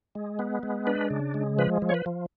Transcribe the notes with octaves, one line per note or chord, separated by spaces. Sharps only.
G#3
B3
G#3
D4 B4
C#3
G#3
F3 B4
F3
C#5
B4
F3